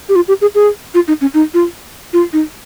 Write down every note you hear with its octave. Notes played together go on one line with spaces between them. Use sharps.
G4
F4
G4
G#4
G#4
F4
D#4
C#4
D#4
F4
F4
D#4